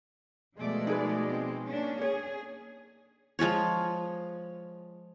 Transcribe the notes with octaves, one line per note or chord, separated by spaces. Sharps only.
B2 F3 G#3 A3 D5
D#4 G#4 B4
C4
A#3 C#4 D4
G#4 C#5
F3 G#3 F4 C#5